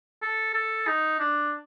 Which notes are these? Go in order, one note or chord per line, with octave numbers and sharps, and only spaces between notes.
A4
A4
D#4
D4